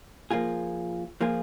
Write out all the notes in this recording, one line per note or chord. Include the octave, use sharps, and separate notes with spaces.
F3 A#3 F4 G#4
F3 A#3 F4 G#4